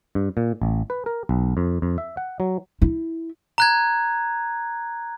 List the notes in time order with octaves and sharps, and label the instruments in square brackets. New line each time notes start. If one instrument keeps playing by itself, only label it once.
[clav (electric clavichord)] G2
A#2
A1
B4
A#4
B1
F2
F2
E5
F#5
F#3
[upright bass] E4
[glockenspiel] A#5 F#6 G#6